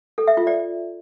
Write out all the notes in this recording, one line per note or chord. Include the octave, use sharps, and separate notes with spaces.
A4
E5
F4
D5